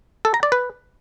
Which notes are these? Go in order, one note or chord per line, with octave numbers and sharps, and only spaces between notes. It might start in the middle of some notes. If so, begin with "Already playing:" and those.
A4
A#5
D5
B4